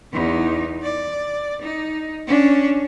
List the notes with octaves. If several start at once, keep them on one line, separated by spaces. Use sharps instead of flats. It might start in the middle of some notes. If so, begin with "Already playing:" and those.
E2 D#4
D5
D#4
C#4 D4